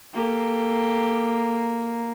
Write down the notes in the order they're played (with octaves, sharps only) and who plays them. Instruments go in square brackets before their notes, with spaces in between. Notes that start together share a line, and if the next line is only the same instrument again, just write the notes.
[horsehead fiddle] A#3 [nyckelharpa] G4 A4